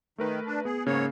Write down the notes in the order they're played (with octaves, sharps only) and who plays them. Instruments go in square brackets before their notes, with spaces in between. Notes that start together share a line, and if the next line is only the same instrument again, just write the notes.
[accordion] D#3 [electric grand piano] A3 A#4 B4
[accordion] D4
[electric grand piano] B3 [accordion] G#4
[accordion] G#2 C#5 [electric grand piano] C#3 A#3